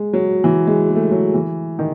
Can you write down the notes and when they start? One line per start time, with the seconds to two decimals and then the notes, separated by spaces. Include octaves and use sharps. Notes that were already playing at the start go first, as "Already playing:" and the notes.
Already playing: G#3
0.13 F#3
0.44 E3
0.67 G#3
0.89 G#3
0.96 A3
1.04 G#3
1.11 F#3
1.34 E3
1.79 D#3